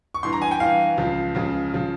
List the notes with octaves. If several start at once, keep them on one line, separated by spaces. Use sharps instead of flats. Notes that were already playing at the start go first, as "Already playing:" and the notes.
C#6
G2 E3 C6
A#5
G#5
G5
G2 E3 F5
C#2 C#3 F3
C#2 C#3 F3
C#3 F3